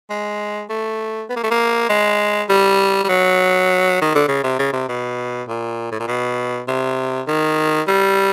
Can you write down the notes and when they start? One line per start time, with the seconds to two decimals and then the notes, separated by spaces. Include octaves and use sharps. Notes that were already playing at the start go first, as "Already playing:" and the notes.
0.10 G#3
0.70 A3
1.29 B3
1.36 A#3
1.44 A3
1.51 A#3
1.89 G#3
2.49 G3
3.04 G3
3.09 F#3
4.02 D#3
4.15 D3
4.28 C#3
4.44 C3
4.59 C#3
4.73 C3
4.89 B2
5.48 A#2
5.92 A2
6.00 A#2
6.08 B2
6.68 C3
7.27 D#3
7.88 G3